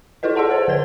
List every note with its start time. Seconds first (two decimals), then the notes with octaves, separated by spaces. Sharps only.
0.23 E4 F4 A4 B4 D#5
0.35 G#4 D5 F#5 A5 C6
0.51 C5 C#5
0.68 D3 B4 G#6 G7